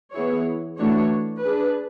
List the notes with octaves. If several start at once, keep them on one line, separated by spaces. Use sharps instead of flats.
E3 B3 E4 G#4 C#5
E3 A3 D4 F#4 C#5
D4 G#4 B4